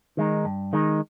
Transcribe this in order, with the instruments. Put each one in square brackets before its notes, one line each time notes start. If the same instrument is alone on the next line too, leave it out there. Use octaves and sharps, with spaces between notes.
[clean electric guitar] D#3 G#3 D#4
G2
D#3 G#3 D#4